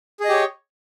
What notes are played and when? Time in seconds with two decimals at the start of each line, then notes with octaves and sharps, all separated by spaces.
0.20 G#4
0.25 D#5
0.29 G4
0.33 C#5